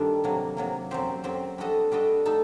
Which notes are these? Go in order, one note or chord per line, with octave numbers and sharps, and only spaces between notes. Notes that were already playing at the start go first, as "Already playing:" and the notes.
Already playing: G2 D#3 G3 D4 A4
C3 F#3 A#3
C3 F#3 A#3
F#2 F#3 C4 G4 C5
F#2 F#3 C4 G4 C5
G3 D4 F#4 A4 D#5
G3 D4 F#4 A4 D#5
A3 D#4 A4